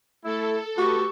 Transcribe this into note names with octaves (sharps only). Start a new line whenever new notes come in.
A3 E4 A4
A3 F#4 G4 B4 C#6